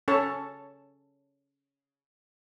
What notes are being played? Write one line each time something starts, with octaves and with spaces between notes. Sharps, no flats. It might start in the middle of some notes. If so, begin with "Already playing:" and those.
C#4 A4 C#5 A5